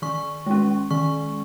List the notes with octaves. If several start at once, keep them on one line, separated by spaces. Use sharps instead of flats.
D#3 C#6
G#3 C#4
D#3 C#6